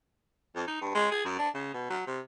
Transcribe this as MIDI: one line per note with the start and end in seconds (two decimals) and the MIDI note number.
0.55 0.67 41
0.67 0.78 63
0.81 0.94 43
0.95 1.10 56
1.12 1.22 68
1.25 1.34 42
1.39 1.49 62
1.54 1.73 49
1.74 1.88 47
1.90 2.06 54
2.07 2.20 48